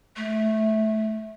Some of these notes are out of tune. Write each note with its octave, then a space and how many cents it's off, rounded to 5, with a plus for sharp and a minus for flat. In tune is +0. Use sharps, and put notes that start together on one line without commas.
A3 -15